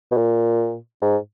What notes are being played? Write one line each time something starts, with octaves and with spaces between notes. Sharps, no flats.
B2
A#2
G#2